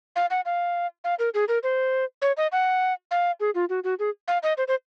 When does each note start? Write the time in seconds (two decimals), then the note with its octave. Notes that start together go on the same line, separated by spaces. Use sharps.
0.16 F5
0.31 F#5
0.46 F5
1.04 F5
1.19 A#4
1.34 G#4
1.48 A#4
1.63 C5
2.22 C#5
2.37 D#5
2.52 F#5
3.11 F5
3.40 G#4
3.55 F4
3.69 F#4
3.84 F#4
3.99 G#4
4.28 F5
4.43 D#5
4.58 C5
4.68 C5